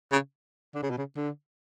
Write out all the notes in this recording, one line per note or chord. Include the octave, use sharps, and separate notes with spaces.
C#3
D3
C#3
B2
C#3
D3